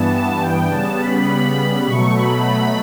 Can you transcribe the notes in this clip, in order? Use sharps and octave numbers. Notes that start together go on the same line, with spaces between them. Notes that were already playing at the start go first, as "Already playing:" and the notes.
Already playing: G2 E3 B3 A5
G5
C#3 G3 B3 A5
B5
B2 F#3 A3 C#6
B5